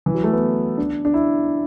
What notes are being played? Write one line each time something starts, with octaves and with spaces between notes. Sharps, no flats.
E3
F#3
A3
B3
D4
D4
E4